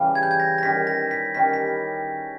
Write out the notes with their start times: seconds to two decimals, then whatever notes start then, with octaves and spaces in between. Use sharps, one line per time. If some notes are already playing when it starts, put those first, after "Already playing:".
Already playing: C#3 E3 G3
0.15 G#6
0.23 G6
0.31 G#6
0.40 A#6
0.58 A#6
0.63 D#3 G3 C#4 B6
0.87 A#6
1.11 B6
1.35 D#3 G3 C#4 B6
1.54 B6